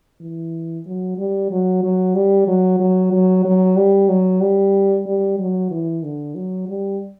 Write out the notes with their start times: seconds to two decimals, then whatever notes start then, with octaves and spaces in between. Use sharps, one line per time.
0.21 E3
0.86 F#3
1.18 G3
1.51 F#3
1.83 F#3
2.15 G3
2.48 F#3
2.80 F#3
3.12 F#3
3.45 F#3
3.77 G3
4.09 F#3
4.41 G3
5.07 G3
5.39 F#3
5.71 E3
6.03 D3
6.35 F#3
6.68 G3